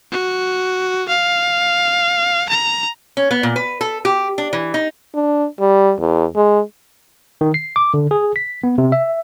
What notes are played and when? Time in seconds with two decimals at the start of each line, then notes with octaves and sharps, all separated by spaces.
0.12 F#4
1.08 F5
2.49 A#5
3.17 C#4
3.31 B3
3.43 A#2
3.56 B4
3.81 A4
4.05 G4
4.38 D4
4.53 E3
4.74 D#4
5.14 D4
5.60 G3
6.00 E2
6.36 G#3
7.41 D#3
7.54 C7
7.76 D6
7.94 D3
8.11 G#4
8.36 B6
8.64 B3
8.78 C3
8.92 E5